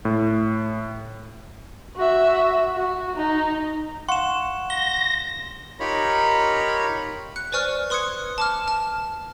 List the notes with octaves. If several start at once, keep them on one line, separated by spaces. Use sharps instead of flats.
A2
F#4 E5
F#4
D#4
F5 F#5 C6 C#6 E7
A#6 G7
D#4 F4 G4 A#4 C#5 B5
F#6 C#7
B4 C5 D5 G#5 C#6 F6
B4 C6 D#6 F#6 G#6 C#7
A5 D6 F6
A5 F6 E7